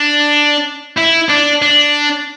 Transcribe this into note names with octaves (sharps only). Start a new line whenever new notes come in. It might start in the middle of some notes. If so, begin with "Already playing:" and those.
Already playing: D4
E4
D4
D4